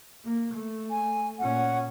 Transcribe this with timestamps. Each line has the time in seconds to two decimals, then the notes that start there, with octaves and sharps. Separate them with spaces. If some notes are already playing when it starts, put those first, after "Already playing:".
0.25 A#3
0.53 A3
0.90 G#5
1.39 A#2 C#4 F#5